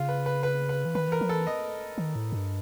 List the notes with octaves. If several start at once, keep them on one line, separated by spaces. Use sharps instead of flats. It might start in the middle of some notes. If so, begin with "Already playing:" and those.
Already playing: C#3 F4
B4
B4
B4
B4
E3
D#3 B4
E3 A#4
F3
E3 A4
D#5
D#3
A2
G2